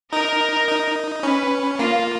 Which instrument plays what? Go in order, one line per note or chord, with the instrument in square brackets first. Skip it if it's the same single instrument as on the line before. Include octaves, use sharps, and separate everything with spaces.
[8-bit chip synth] D#4 [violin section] A#4
[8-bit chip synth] D#4
[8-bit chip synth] C#4 [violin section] B4
[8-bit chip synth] A#3 [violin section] F4